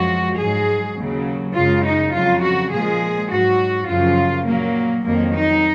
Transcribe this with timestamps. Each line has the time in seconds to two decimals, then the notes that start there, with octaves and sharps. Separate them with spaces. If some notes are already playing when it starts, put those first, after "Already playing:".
Already playing: F#2 F3 G#3 F#4
0.37 G#2 F#3 G#4
0.95 D#2 C#3 F#3
1.54 F#2 C#3 G#3 F4
1.83 D#4
2.12 F2 C#3 F#3 F4
2.41 F#4
2.70 A#2 F3 G#3 G#4
3.29 G#2 F#3 F#4
3.87 F#2 C#3 F3 F4
4.46 A#2 F#3 A#3
5.03 F2 D#3 F#3 A#3
5.33 D#4